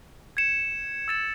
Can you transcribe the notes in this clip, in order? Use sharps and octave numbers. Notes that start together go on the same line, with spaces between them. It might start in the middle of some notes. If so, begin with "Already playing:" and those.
G#6 C#7 E7
E6 A6 E7